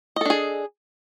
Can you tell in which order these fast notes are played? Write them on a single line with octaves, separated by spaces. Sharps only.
D#5 A4 D4 G#4